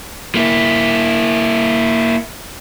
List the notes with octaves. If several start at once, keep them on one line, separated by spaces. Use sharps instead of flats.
A#3 E4